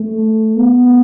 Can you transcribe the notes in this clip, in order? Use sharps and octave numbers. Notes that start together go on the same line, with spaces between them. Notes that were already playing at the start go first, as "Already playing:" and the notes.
Already playing: A3
B3